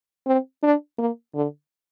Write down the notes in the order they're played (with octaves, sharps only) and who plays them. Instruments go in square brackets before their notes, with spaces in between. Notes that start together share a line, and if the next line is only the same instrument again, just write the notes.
[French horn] C4
D4
A#3
D3